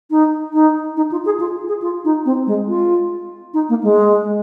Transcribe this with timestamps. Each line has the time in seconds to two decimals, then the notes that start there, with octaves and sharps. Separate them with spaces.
0.10 D#4
0.53 D#4
0.96 D#4
1.11 F4
1.25 G#4
1.40 F4
1.68 G#4
1.82 F4
2.04 D#4
2.25 C4
2.47 G#3
2.68 F4
3.53 D#4
3.69 A#3
3.83 G#3